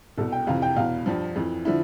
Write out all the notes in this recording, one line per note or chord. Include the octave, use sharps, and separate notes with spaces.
C2 B2 A4
G5
F2 C3 E3 F5
G5
E2 B2 F5
G2 F3
F2 E3
D3 F3 E4